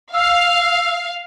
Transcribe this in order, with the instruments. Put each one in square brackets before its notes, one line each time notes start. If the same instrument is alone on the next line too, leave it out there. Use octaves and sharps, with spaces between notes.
[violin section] F5 [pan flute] E6